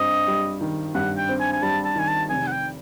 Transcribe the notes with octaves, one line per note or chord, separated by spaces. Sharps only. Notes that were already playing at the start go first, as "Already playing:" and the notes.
Already playing: G2 C4 D#5
G3
D#3
G2 F#5
G5
C4
G#5
G#5
G3 A5
A5
D#3 G#5
A5
F1 G#5
F#5
G5